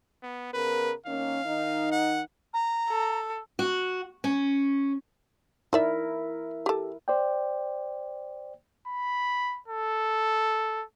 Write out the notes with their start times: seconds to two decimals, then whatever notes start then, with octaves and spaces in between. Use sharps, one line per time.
0.23 B3
0.54 C#3 B3 A#4 B4
1.06 D#3 A#3 C#4 F5
1.44 D#3 D#4
1.92 F#5
2.53 A#5
2.89 A4
3.59 F#4
4.24 C#4
5.73 D#4 E4 A#4 D5 E5
6.66 G4 A4
7.08 C5 D5 G5
8.88 B5
9.68 A4